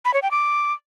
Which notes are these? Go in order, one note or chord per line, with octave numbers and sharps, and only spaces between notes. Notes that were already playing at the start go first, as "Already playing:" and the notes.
B5
C#5
G5
D6